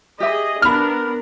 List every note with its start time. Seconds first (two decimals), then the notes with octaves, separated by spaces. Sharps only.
0.20 G4 G#4 D#5 E5
0.62 B3 D4 A#4 B5 F6